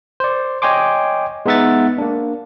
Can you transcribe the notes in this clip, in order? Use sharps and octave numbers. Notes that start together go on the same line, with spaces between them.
C5 D5
C#5 D#5 G5 G#5 C6 D6
G#3 B3 D#4 E5 F#5 A6
A#3 D4